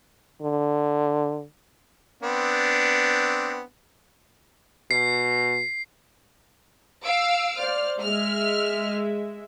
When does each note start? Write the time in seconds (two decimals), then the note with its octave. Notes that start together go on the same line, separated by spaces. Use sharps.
0.42 D3
2.23 B3 C4 D4
4.91 B2 C7
7.04 F5 E6 D7
7.58 C5 D5 F6
8.00 G#3 E5 F6